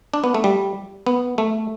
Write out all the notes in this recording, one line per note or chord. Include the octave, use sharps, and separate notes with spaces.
D4
B3
A3
G3
B3
A3